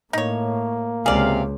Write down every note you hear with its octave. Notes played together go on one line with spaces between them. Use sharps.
A2 A#3 D#4 C#5
C#2 C3 G#4 D5 F5